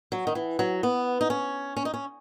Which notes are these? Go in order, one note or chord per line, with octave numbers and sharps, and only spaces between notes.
F#3
D#3
E3
F#3
B3
D#4
C#4
C#4
D#4
C#4